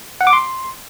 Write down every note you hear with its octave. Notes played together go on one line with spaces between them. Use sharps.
F#5
D6
C6